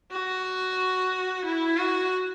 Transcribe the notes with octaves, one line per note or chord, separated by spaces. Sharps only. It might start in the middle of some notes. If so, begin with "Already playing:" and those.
F#4
E4
F#4